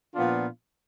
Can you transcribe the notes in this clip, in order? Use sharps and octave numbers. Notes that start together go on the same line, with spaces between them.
A#2 F3 B3 D4 F4